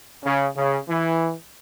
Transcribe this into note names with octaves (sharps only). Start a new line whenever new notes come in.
C#3
C#3
E3